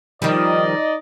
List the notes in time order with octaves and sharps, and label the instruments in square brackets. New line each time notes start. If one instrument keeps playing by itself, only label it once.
[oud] D#3 F3 G3 [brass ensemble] D#4 D5 D#5